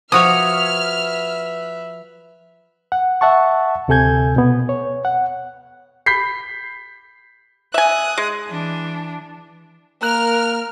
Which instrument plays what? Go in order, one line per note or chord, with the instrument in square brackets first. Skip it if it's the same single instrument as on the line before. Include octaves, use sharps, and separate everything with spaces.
[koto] F3 F#4 C#5 [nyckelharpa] B4 E5 [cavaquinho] D#6 [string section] F6
[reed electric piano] F#5
E5 F#5 A5 C#6
D2 C3 A4 G#5 G6 G#6
B2 B3
C#5
F#5
[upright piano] B5 G6 B6 C7
[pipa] E5 G#5 [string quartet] D#6 F#6
[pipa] G#3
[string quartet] E3 D4
[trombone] A#3 [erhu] A#4 [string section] F6 [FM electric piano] F#6